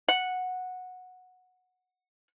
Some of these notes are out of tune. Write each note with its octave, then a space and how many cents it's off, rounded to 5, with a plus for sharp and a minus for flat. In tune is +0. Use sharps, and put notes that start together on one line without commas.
F#5 -10